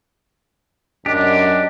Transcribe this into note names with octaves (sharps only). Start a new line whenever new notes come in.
F#2 D4 G4 D#5